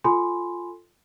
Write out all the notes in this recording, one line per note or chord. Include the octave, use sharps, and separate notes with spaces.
F4 A4 G#5 B5 C6